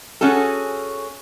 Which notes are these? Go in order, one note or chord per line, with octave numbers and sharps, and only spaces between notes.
C#4 F#4 G#4 A4